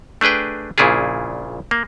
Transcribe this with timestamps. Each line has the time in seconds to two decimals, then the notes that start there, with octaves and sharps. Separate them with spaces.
0.21 A3 D4 G#4 B4 G5
0.78 A#1 A#2 C#3 E4 F4 G#4
1.71 A#3